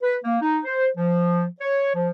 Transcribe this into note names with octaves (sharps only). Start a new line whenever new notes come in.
B4
A#3
D#4
C5
F3
C#5
F3